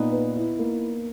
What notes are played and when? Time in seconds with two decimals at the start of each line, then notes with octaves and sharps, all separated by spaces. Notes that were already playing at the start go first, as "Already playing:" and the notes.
Already playing: A#2 B3 D#4
0.12 B4
0.36 E4
0.59 A#3